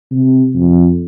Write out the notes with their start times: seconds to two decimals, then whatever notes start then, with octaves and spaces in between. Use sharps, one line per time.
0.11 C3
0.55 F2